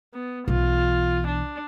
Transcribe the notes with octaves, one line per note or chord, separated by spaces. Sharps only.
B3
B1 E3 F4
D4